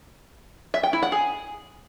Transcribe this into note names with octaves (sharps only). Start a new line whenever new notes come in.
E5
G5
E4
F#5
G#4